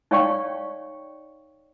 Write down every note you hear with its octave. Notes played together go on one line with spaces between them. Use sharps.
D#4 C#5 D5 F5 G5 C#6